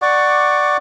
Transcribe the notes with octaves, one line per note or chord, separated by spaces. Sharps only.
D5 F#5 C#6 D6